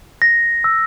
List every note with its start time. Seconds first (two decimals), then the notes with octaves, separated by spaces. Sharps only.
0.22 A#6
0.64 E6